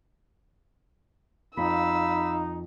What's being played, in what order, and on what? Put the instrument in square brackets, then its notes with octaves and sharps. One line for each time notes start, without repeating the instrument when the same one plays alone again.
[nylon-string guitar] F2 [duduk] D#4 [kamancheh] F5 E6 [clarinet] B5